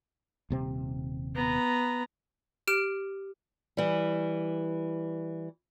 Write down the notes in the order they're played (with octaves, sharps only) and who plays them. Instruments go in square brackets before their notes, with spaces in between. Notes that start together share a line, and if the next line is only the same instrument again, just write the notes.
[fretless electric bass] D#1 C3 C4
[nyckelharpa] B3 A#5
[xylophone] G4 F6 D7
[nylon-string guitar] E3 G3